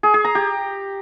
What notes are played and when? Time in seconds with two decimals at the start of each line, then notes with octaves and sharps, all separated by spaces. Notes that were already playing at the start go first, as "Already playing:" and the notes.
0.03 G#4
0.14 G#4
0.25 A#5
0.35 G4